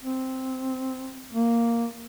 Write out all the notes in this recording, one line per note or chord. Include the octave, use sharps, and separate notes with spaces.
C4
A#3